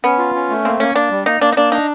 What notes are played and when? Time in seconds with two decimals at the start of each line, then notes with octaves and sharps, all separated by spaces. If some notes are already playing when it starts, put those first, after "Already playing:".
0.04 B3 C#4
0.18 F4
0.35 C#4
0.49 A3
0.64 A#3 C4
0.80 A#3 C#4
0.95 A#3 D4
1.10 G3
1.26 A#3 D#4
1.41 A#3 D4
1.52 D#4
1.56 A#3 D4
1.72 D4 D#4